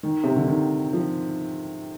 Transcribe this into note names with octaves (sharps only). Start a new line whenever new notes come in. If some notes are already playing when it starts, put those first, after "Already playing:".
D#3
C3
D3
D#3
F3